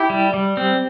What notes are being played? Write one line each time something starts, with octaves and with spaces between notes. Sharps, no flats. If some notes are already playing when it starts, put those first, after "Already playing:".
Already playing: E4 G4
G3
G3
C4